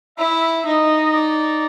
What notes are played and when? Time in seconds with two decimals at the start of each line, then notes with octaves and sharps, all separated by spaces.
0.18 E4 E5
0.66 D#4 D#5
1.14 D5